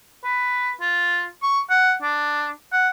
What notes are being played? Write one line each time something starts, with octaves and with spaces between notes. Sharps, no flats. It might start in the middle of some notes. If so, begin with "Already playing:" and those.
B4
F4
C#6
F#5
D4
F#5